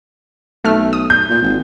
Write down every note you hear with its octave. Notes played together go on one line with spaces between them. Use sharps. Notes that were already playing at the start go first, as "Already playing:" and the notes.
B1 A3 F6
D#6
G6
A#2
G#1